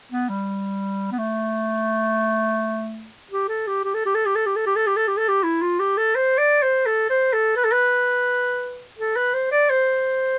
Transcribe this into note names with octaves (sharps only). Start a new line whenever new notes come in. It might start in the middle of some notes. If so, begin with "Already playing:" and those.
B3
G3
B3
A3
G4
A4
G4
G4
A4
G4
A4
G4
A4
G4
A4
G4
A4
G4
A4
G4
A4
G4
E4
F4
G4
A4
C5
D5
C5
A4
C5
A4
B4
A4
B4
A4
B4
C5
D5
C5